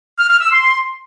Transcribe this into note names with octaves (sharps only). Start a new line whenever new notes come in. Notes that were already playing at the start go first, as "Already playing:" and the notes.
F6
F6
E6
C6